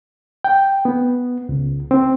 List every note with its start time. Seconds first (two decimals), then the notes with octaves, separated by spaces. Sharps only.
0.44 G5
0.85 B3
1.49 C#2
1.91 C4